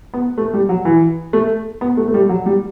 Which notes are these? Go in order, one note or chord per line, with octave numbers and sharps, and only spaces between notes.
B3
A3
G3
F#3
E3
A3
B3
A3
A3
G3
F#3
G3